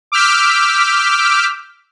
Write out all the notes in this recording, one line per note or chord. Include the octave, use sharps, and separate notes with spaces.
D6 E6 F6 G6 B6 D7